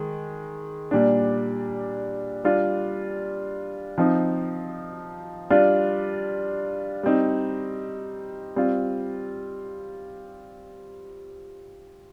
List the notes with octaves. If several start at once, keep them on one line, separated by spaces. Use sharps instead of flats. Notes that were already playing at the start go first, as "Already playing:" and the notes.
Already playing: D#3 G#3
A#2 G3 D4
G3 D4 F4
F3 C4 D#4
G3 D4 F4
G3 C4 D#4
G3 C4 F4